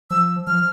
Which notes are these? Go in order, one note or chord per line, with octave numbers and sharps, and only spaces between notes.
F3 E6
F3 F6